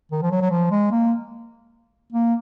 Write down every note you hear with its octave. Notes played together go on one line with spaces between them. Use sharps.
D#3
F3
F#3
F#3
F3
G#3
A#3
A#3